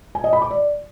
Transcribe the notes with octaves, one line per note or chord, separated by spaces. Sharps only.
G#5
D#5
B5
D6
D5